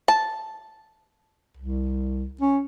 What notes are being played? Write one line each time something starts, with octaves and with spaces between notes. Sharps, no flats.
A5
C2
C#4